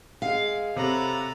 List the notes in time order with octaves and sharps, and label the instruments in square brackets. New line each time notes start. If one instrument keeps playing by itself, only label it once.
[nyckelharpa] G#3 [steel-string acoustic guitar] F5
[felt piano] C3 [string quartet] A4 A#5 B5 [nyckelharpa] C#5 F#5